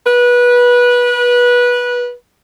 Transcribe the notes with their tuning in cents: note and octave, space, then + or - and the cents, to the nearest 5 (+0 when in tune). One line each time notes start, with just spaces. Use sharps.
B4 -20